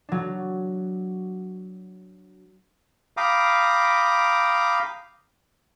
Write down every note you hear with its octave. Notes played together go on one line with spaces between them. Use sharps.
F#3 D4
F5 G5 A#5 B5 D6 D#6